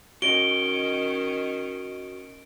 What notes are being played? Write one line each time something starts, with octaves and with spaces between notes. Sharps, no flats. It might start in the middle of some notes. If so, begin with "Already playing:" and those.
D#3 C#4 F#4 C#5 D#5 D7 G7